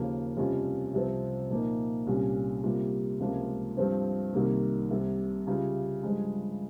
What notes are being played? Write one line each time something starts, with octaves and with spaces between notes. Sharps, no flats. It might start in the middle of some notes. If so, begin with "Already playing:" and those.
Already playing: D#2 C#3 F3 A#3
F2 C3 G3 C#4 F4
C2 C3 F3 C4
A#2 F3 A#3 D#4
C2 A#2 G3 C#4
C3 G3 A#3 F4
C#2 C3 F3 A#3 F4
G2 F3 C4
C2 C3 D#3 A#3
C2 C3 G3
C#3 G3 C#4 F4
G2 F3 G#3